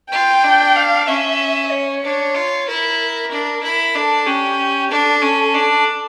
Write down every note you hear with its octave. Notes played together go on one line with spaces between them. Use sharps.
F4 G5
D4
F5
C#4 E5
C#5
D4
F4
E4 A#4
D4
E4
D4 A4
C#4 G4
D4 A4
C#4
D4